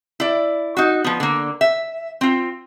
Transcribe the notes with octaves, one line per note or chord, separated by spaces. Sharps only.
E4 D5
D#4 F#4
F3 B3
D3 A#3
E5
C4 F4